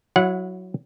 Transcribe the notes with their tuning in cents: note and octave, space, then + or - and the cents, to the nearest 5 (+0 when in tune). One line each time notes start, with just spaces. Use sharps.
F#3 +0 E4 +10 F#5 -25